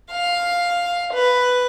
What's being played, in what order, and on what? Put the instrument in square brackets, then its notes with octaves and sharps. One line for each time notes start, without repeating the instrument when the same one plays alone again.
[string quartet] F5
B4